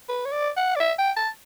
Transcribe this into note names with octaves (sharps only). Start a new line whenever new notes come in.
B4
C#5
D5
F#5
D5
E5
G5
A5